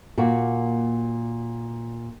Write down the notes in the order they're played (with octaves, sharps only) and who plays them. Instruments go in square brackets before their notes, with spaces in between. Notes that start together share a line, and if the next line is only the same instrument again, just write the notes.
[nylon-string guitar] A#2 A#3 F#4